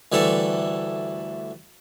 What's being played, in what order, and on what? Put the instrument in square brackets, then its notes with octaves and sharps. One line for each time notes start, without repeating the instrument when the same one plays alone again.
[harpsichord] D2 E3 G3 A3 A4